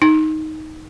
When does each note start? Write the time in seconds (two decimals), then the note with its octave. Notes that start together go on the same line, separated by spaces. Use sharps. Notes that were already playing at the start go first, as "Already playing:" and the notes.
0.02 D#4